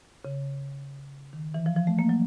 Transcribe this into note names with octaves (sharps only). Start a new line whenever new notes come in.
C#3
D#3
E3
F3
F3
A3
A#3
F#3